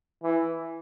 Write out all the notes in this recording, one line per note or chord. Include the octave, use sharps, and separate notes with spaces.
E3